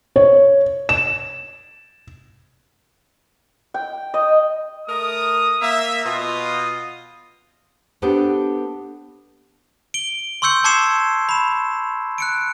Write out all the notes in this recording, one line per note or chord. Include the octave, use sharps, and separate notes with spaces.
C#5
E7
G5
D#5
A3 A#4 D#6
A#3 E5
B2 F4 D#6
B3 D4 G4 A4 B4 C5
D7 G7
C6 C#6 E6 G6 C#7
A5 D6 G#6 C7 C#7 E7
B5 E7
F#6 C#7 D7